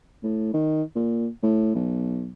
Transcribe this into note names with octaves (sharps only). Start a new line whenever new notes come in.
A2
D#3
A#2
A2
B1